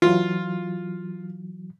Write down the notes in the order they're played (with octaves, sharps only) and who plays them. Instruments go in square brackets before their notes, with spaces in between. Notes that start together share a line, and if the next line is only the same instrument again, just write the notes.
[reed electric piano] E3 F#3 [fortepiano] F4